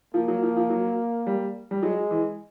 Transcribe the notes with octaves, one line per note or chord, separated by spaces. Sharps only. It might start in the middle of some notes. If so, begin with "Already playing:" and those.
F3 A#3
F#3
F3
F3
F#3
G3
G3
F#3 G#3
E3